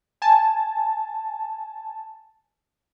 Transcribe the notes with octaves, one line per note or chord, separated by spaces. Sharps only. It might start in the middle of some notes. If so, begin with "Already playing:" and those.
G#5 A5